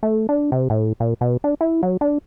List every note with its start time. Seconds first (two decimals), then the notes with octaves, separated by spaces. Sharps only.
0.03 A3
0.29 D4
0.52 C3
0.70 A2
1.00 A#2
1.21 B2
1.44 D4
1.61 E4
1.83 F#3
2.01 D4